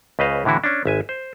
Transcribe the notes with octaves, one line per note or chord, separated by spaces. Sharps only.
C#2 C#3 B4 C5 D#5 F5
A2 D3 E3 E4 F#4
C#4 D4
G#1 E5 G#5
C5